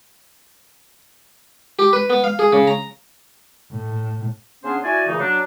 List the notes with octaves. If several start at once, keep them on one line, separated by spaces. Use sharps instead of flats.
G4
B4
B3
F5
G#4
C#3
A#5
A2
C#3 B3 C#4 D4 G#4 C5
E4 F#4 D5 G#5
A#2 C#3 E3 A3 D#4
F#3 D4